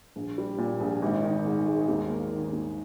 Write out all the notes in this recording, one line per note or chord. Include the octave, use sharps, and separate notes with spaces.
A#1
G3
A#2
A#1
G#1
D#3
G#2
G#3
D#2
A#3
D#3
D#2